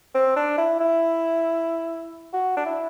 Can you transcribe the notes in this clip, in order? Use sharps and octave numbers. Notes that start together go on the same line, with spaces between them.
C4
D4
E4
E4
F#4
D4
E4